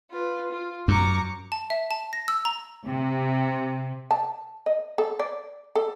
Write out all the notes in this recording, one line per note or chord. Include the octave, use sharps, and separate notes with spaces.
F4 B4
F4
F#2 A#5 C#6 D6
A5
E5
A5
A#6
E6
A#5
C3
A5
D#5
A4
D5
A4